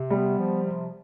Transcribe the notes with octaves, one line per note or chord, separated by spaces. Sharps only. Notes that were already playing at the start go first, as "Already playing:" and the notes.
Already playing: C3
G3 B3
F3
C3